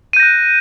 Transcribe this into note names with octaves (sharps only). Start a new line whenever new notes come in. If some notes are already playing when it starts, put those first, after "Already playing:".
F#6 G6 A#6 D#7